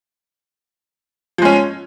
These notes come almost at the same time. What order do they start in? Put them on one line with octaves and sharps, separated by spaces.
F3 G#3 C#4